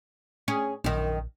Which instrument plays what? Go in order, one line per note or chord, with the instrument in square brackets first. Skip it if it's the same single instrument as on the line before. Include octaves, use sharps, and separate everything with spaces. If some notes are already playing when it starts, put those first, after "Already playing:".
[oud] C#4 G#4
[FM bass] A#1 [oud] F#2 D#3